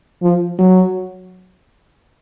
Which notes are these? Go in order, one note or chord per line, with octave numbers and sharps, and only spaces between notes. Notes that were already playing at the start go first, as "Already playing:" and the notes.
F3
F#3